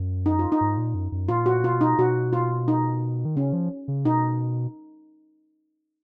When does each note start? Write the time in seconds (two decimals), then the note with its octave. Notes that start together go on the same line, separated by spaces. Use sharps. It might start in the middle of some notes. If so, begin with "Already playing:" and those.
Already playing: F#2
0.26 D#4
0.39 F4
0.52 D#4
0.61 G#2
0.77 A#2
0.95 F#2
1.12 F#2
1.29 A#2 F4
1.46 F#4
1.63 B2 F4
1.81 D#4
1.98 B2 F#4
2.33 F4
2.68 D#4
3.25 D#3
3.36 C#3 C#4
3.53 F3
3.88 C#3
4.05 B2 D#4